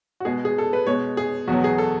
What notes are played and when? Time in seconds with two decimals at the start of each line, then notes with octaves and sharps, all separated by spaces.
0.20 F#4
0.25 B2 G#3 G#4
0.45 G#4
0.58 A4
0.73 B4
0.86 B2 G#3 C#5
1.17 G#4
1.48 E2 B2 F#3 F#4
1.64 G#4
1.78 A4